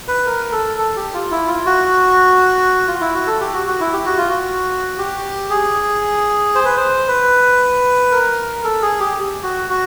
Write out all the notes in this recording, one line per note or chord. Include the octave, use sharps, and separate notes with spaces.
B4
A#4
A4
A4
G4
F4
E4
F4
F#4
F4
E4
F#4
A4
G4
F#4
F#4
E4
G4
F#4
F4
F#4
G4
G#4
C5
B4
C5
B4
A#4
A4
G#4
G4
F#4
F#4